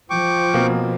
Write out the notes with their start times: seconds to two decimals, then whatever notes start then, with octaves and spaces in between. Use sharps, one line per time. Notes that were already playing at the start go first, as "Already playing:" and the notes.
0.10 F3 G5 C#6 D6
0.54 B2 A#3 C4